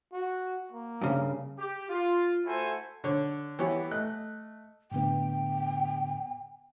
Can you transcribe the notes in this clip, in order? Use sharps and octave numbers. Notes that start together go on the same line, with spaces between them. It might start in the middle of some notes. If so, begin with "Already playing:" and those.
F#4
A#3
G2 C#3
G4
F4
A3 E4 F#4 A4 C5 G#5
D3 C#5
E3 B3 G4 C#5
A3 D#5 F#6
A2 D3 B3 G5